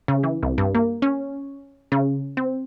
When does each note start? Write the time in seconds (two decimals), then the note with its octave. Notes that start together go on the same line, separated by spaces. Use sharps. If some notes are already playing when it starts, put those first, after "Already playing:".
0.08 C#3
0.23 E3
0.43 C2
0.58 G2
0.75 A#3
1.02 C#4
1.92 C#3
2.37 C4